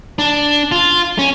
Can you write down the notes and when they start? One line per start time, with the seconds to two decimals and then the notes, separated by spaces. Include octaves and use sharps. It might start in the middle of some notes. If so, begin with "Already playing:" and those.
0.19 D4
0.72 F4
1.19 C#4